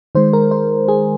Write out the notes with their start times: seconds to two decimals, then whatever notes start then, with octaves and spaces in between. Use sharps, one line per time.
0.15 D#3 G#3 C5
0.33 A#4
0.51 C5
0.88 G#4